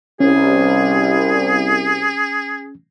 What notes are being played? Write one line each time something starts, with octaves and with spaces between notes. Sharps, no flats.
C2 C#4 G#4